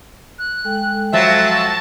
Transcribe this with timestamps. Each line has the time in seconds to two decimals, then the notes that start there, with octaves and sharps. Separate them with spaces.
0.38 F#6
0.65 G#3 A4 G5
1.13 F3 F#3 E5 A5